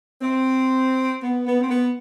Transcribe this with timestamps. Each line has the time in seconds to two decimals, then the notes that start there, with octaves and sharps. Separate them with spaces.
0.22 C4
1.23 B3
1.46 B3
1.61 C4
1.69 B3